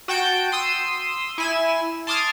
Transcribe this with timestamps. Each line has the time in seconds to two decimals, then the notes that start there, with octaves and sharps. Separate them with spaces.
0.08 F#4 G5 A5 G6 D7
0.52 C6 D#6 E6 D#7
1.38 E4 G#5 E7
2.07 A5 C6 D6 D#6 F6 G#6